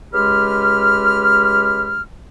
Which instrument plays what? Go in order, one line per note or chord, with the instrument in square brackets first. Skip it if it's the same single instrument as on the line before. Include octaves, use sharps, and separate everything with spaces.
[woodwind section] C#2 G#3 G4 B5 F6